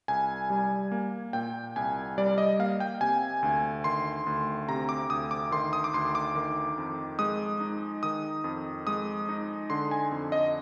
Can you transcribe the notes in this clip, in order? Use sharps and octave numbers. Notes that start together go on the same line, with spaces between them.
C2 G#5
G3
A#3
A#2 G5
C2 G#5
G3 D5
D#5
A#3 F5
G5
C3 G#5
D2
D#3 C6
D2
C3 A#5
D6
D2 D#6
D6
D#3 C6
D#6
D6
D2 C6
D6
D#3
F2
G#3 D#6
D#4
D#3 D#6
F2
G#3 D#6
D#4
D3 C6
G#5
F2
D#5